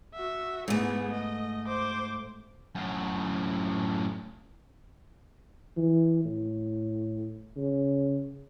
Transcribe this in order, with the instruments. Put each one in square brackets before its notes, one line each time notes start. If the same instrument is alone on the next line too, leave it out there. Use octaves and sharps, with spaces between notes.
[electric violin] F#4 E5
[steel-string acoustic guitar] G#2 A3 [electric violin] B3 G#4
[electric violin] D#5
C5 D6
[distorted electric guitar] F#2 A2
[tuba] E3
A2
C#3